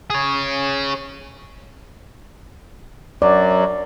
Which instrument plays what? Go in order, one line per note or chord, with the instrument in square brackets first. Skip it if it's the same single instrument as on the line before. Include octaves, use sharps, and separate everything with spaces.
[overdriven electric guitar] G#4 C#5
[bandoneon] F#2 F#3 [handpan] D5